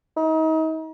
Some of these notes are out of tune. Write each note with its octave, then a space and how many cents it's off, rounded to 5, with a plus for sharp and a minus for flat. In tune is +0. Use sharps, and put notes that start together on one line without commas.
D#4 +35